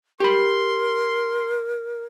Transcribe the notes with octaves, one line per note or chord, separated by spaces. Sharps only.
G4 A#4 B5 C6